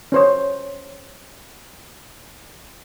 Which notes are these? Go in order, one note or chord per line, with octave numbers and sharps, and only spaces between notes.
C#4 C5 C#5